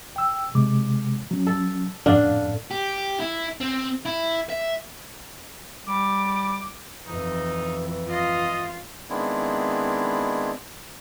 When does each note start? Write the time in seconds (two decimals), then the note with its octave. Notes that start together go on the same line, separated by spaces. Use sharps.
0.16 G5 E6
0.55 C3 G#3 D6
1.31 F#3 C#4
1.47 A4
2.06 F2 A2 D3 D4 F5
2.71 G4
3.21 E4
3.61 C4
4.06 E4
4.50 E5
5.86 G3 D6
7.07 F2 E3 D#4
8.09 F4 D#5
9.10 D#3 G#3 B3 C4 D4 E4